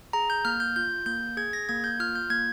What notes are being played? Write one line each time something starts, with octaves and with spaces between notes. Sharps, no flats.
G#4 A#5
G6
A#3 F6
G6
F4 G6
A#3 G6
G#4 G#6
A#6
A#3 G#6
G6
F4 F6
G6
A#3 G#6